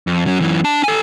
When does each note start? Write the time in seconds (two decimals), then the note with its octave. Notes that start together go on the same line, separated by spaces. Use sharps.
0.07 F2
0.26 F#3 C#4
0.40 F#2 E3
0.64 D4 A5
0.84 A4 G#5